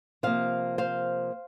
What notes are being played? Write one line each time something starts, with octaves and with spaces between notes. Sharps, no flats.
C3 F3 A#3 C5 F5
C5 F5